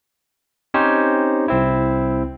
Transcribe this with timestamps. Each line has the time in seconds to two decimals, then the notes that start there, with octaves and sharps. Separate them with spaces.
0.74 C4 C#4 D#4 G4 C5 C#5
1.48 C2 C4 E4